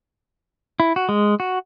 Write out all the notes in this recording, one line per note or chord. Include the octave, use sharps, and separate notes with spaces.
E4
F#4
G#3
F#4